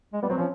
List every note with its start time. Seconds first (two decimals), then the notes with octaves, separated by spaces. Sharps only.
0.13 G#3
0.22 G3 B3
0.29 F#3 C4
0.38 F3 C#4